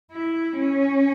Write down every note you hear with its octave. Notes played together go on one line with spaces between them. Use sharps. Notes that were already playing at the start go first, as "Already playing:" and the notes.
E4
C#4